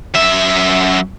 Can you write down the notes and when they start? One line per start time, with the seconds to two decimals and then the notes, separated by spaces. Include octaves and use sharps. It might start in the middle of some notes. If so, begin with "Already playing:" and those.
0.15 F#2 E5